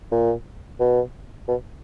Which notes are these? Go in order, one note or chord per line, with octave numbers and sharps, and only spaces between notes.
A#2
B2
B2